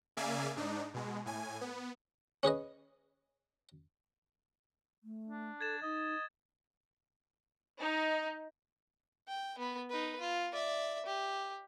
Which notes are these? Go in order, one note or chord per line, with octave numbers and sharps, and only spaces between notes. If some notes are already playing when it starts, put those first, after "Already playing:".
C#3 A#3 D5 E5 F5 G#5
G#2 D4 D#4
B2 G#3
A2 G#5
B3
C#4 G#4 B4 D#5
A3
D4
A4 G#6 A6 E7
D#4 D#5
D#4
G5
B3 B5
D#4 B4
F4
D5 E5
G4